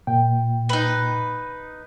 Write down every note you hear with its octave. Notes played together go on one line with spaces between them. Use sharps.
A#2 G5
D#4 B4